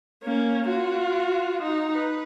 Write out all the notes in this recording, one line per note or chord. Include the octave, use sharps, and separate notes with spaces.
A#3 C#4
F4 F#4
D#4
B4